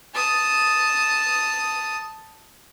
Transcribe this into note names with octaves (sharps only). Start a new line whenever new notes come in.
A5 D#6